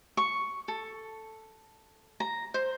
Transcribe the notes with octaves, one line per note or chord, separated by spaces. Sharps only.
C#6
A4
A#5
C5